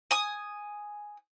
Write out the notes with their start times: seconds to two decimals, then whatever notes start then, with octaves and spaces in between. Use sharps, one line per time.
0.11 G#5 D#6